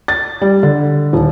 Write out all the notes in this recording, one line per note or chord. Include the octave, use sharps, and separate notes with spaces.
A6
G3
D3
D#1